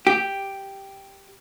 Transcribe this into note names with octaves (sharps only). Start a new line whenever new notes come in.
G4